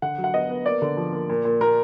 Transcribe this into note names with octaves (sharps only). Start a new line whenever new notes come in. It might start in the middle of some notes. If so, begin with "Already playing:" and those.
D3 F#5
F#3
F#5
B3 D#5
B3
A#3 D5
D3
F3
A#3
A#2
A#2
A#2 A#4